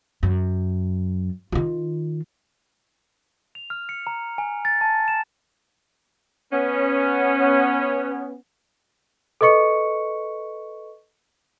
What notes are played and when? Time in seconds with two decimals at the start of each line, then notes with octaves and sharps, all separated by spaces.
0.23 F#2
1.52 D#3 F4
3.55 F7
3.70 F6
3.89 C#7
4.07 A#5
4.38 G#5
4.65 A6
4.81 A5
5.08 E7
6.52 B3 C#4
9.41 A4 B4 D#5 C#6 C#7